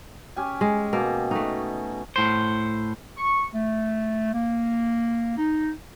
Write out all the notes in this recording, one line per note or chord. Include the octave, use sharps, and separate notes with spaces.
C#4 G4 G#5
G#3
B2 A#3
A3 D#4 F#4
A2 C5
C#6
A3
A#3
D#4